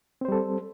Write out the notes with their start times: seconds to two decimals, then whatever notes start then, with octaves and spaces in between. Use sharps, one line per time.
0.21 C4
0.25 C5
0.28 G3
0.32 A4